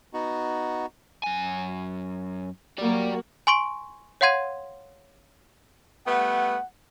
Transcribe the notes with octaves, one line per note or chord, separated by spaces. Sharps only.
B3 D#4 F#4
F#2 G#5
F#3 A#3 F#4 G4 D5
G#5 C6 C#6 D7
C#5 F5 F#5 C6 G#6 D#7
G3 A3 B3 F#5